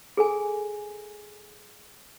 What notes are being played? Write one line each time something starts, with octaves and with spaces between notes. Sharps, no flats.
G#4 A4 G#5